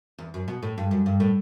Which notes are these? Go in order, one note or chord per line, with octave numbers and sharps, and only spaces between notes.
E2
F#2
B2
A2
G2
F#2
G2
A2